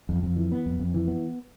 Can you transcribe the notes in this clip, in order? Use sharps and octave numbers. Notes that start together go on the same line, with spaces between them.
F2
F2
E3
B3
F2
F2
E3
B3